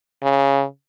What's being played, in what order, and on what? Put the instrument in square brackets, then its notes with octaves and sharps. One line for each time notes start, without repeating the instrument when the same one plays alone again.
[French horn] C#3